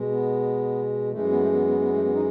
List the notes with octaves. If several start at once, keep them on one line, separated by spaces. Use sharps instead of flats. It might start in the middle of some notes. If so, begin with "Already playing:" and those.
Already playing: B2 G#3
B3
F#2 E3 G#3 A3
B3
A3
B3
B3
B3
A3
B3
D#4